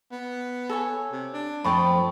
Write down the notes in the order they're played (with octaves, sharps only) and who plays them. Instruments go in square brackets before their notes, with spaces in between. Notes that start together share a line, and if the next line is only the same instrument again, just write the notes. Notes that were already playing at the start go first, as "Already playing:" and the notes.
[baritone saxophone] B3
[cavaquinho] A4 C#5 G#5
[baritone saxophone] C3
D4
[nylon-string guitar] F2 F3 [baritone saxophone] A3 [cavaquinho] G5 A5 D#6 [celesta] B5 C#6